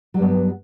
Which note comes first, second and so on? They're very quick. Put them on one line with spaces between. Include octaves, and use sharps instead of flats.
F#3 G3 G2 B3